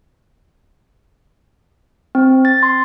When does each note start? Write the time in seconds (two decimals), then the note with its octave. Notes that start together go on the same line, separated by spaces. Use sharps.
2.15 C4
2.45 A6
2.63 C6